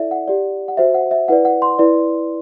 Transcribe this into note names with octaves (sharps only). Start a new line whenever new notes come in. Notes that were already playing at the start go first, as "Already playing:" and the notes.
Already playing: E4 A4 D5 E5
F#5
G4 D5
F#5
F#4 C5 E5
F#5
E5
E4 B4 D5 F#5
F#5
C6
E4 B4 D5